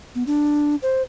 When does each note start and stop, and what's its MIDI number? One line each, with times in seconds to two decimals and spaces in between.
0.15 0.23 59
0.27 0.75 62
0.82 1.02 72